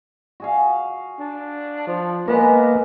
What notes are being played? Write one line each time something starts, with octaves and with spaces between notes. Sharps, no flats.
F#4 G#4 F5
D4
F3
G#3 A#3 B3 A#4